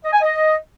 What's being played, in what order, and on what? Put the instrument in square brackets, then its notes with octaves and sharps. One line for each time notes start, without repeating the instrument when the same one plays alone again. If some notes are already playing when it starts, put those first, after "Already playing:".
[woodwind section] D#5
G#5
D#5